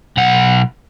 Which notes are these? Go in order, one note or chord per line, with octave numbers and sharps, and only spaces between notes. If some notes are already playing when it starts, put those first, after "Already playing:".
B1 F#5